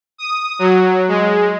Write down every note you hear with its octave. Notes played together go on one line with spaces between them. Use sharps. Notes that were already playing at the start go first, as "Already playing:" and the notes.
D#6
F#3
G#3